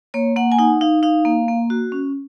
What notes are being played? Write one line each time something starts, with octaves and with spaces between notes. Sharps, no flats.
A#3 C#5
A#3 F#5
G#5
D#4 F#5
D#4 F5
D#4 F5
A#3
A#3
F#4
C#4